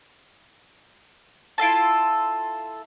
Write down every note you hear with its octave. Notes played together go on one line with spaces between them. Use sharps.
E4 F4 A4 A5